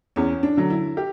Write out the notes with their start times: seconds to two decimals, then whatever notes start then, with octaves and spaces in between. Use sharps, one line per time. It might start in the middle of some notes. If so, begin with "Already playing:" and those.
0.16 E2 C#4
0.43 D4
0.57 D3 F#3
0.70 E4
0.97 G4